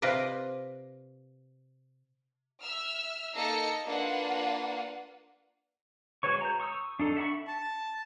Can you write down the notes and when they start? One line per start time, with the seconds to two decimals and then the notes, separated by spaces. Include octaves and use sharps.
0.02 C3 F4 B4 D5 D#5
2.60 E5 E6 F6
3.34 A#3 D#4 A4 D#5 A#6 C#7
3.85 A#3 D4 F4 B4 F#5
6.23 G#3 F#4 B4 C#5 C#6
6.41 A#5 G6
6.60 C#6 D#6 E6
6.99 D4 D#4 A4
7.17 E5 F#5 B5 C#6
7.47 A5